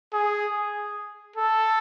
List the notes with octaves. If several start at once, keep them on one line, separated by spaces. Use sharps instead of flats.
G#4
A4